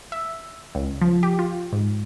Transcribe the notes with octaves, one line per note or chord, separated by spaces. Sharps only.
E5
C#2
F3
G4
F4
G#2